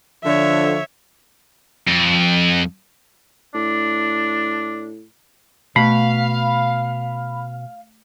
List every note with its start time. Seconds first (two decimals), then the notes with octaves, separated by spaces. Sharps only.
0.24 D3 F3 C#5 E5
1.88 F2
3.55 A2 D4
5.76 B2 A3 F5 B5